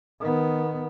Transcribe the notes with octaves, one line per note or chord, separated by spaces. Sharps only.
D#3 B3